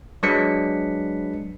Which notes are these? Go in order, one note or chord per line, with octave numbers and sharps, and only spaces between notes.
F#3 G#3 D4 B4 B6 C#7